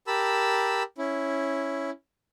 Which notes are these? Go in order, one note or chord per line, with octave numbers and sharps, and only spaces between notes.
G4 A#4 A5 B5 E6
C#4 E4